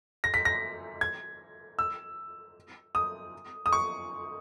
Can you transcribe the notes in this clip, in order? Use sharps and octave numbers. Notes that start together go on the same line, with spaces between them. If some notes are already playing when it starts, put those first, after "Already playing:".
A#6
B6
A#6
G#6
E6
D#6
D#6
C#6